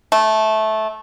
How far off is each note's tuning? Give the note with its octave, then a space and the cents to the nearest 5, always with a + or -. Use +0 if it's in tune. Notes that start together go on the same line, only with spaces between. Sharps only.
A3 -15